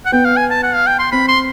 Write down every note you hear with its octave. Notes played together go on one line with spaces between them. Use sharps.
F#5
B3 G5
F5
G#5
A5
F#5
F5
G5
C6
C4 B5
C6